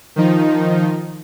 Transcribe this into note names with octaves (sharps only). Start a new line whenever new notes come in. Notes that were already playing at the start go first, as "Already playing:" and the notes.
D#3 F3 D#4